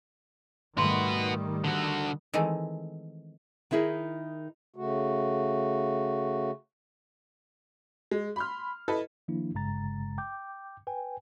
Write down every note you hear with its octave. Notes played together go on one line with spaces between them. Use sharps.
G#2 D#3 G3 A3 F#4 B4 C6
D3 F#4
D#3 E3 G#3 A3 C4
D#3 D#4 E4 G#4 A#4
C#3 A3 F#4
G#3
B5 C6 F6
E4 A4 B4 D#5
D#3 F3 A#3 D4 E4
G1 G2 C#3 G#3 A#5 A6
G5 D6 G6
B4 G5 G#5